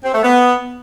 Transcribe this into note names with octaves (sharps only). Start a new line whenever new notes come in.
C4
A3
B3